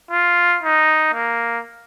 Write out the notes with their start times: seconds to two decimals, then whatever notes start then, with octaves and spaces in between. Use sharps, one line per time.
0.11 F4
0.63 D#4
1.14 A#3